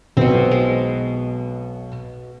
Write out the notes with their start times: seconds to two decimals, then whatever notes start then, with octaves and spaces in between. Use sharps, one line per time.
0.17 B1 B2 B3 C4
0.51 G#3